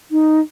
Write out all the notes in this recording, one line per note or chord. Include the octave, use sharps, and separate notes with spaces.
D#4